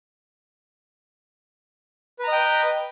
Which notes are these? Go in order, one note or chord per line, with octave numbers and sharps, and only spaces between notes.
B4 D#5 G5 A#5